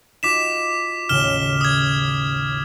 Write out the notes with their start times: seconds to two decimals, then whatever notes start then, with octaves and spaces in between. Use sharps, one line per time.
0.23 D#4 F4 F#4 D6 B6 E7
1.09 A1 D#2 C#3 F6 E7 G7
1.61 D#6 G#6